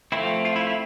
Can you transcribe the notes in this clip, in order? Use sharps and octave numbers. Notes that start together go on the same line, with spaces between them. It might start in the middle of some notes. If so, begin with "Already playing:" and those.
F3 A3 C4 E4
F4
E4
E4